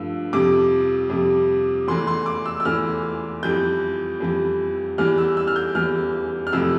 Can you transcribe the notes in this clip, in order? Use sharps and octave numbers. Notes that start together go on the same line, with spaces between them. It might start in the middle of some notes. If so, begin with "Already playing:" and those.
Already playing: G2 F3 A3 E6
F2 C3 G3 D6
F2 C3 G3
E2 E3 A3 C6
C6
D6
E6
E6
E2 E3 A3 F6
F2 E3 G3 G6
F2 E3 G3
E2 E3 G3 F6
E6
E6
F6
G6
E2 E3 G3 F6
F6
F2 C3 E3 A3 E6